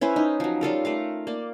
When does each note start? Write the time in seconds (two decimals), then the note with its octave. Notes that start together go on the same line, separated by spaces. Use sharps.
0.01 C#4 E4 B4 C5
0.16 D#4
0.40 F3 F#3
0.61 G3 F4 A4 A#4
0.85 A3 A#4 F5
1.27 A#3 D5